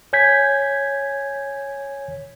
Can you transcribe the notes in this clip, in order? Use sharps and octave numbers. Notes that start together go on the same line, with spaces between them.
C#5 G#5 G6 G#6 B6